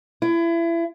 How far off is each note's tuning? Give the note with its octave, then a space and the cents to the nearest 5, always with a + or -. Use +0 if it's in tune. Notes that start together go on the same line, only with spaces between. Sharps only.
E4 +30